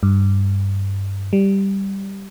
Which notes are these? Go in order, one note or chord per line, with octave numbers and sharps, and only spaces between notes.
G2
G3